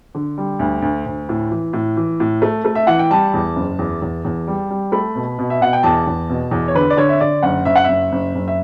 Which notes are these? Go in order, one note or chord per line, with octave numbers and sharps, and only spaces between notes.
D3
G3
D2
D2
D2
A2
E3
A2
E3
A2
A3
A3
E5
E3 F#5
G5
G3 A5
E2
F#1
E2
E2
E2
G3
G3
A3 B5
B2
B2
E5
B2 F#5
G5
E2 A5
E2
B2
E2
C#5
D3 B4
D5
D3 C#5
E5
D3 D5
F#1 F#5
F#1 E5
F#5
F#1 E5
F#1
F#1
E5